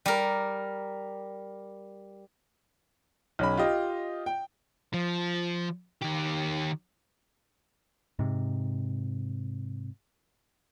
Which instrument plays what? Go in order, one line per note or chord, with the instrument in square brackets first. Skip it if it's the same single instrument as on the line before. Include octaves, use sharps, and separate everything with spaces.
[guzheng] G3 A#4
[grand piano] B1 C#4 B5
F4 G4 D#5
G5
[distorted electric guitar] F3
D#3 G4
[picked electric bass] G#2 C3